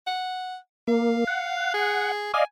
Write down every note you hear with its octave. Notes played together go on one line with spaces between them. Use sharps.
F#5
A#3 F5
F#5
G#4
D5 D#5 F5 G#5